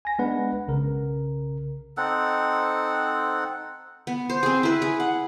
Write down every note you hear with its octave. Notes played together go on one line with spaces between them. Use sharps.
G#5 A#6
G#3 B3 D4 B4 F#5
B1 C#3 A#4
C4 D#4 A4 F#5
B3
C5
C4 G#4
E4 B4
G#4
F#5